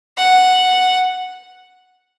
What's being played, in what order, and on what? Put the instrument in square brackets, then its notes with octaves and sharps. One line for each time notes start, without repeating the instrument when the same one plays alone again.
[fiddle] F#5